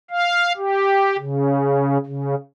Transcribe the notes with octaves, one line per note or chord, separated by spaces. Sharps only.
F5
G4
C#3
C#3